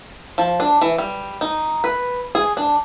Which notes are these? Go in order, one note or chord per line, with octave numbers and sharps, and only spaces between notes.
F3
D4
E3
G3
D#4
B4
G#4
D4